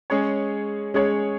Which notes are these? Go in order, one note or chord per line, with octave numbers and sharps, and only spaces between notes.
G#3 C#4 G#4 C#5
G#3 C#4 G#4 C#5